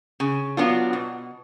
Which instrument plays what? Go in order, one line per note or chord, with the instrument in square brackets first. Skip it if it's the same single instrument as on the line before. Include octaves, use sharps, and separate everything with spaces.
[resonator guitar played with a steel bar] C#3
F#3 B3 D4 F4
B2